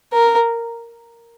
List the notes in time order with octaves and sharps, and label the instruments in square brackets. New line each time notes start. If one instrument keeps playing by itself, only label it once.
[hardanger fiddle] A#4